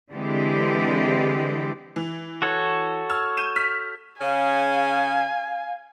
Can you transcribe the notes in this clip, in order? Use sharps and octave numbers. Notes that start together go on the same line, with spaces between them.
D3 E3 G#3 C4 G4
E3
F#4 A4 C#5
E6 F6 G#6
G6 D#7 E7
F6 B6
C#3 C#4 F5 G#5